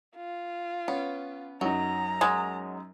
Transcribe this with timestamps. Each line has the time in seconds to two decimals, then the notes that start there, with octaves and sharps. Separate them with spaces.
0.16 F4
0.88 B3 C#4
1.61 F#2 F#3 D#4 A#5
2.21 F#3 G#3 B5